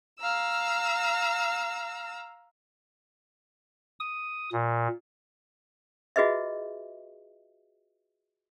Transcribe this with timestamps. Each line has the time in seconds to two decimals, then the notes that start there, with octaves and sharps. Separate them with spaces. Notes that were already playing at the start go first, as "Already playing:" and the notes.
0.19 F5 A#5 E6
4.00 D#6
4.53 A#2
6.16 F4 F#4 G#4 B4 D#5 E5